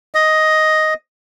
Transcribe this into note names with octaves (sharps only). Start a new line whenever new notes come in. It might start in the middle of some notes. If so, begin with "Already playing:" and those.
D#5